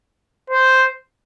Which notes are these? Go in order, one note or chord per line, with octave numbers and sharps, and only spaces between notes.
C5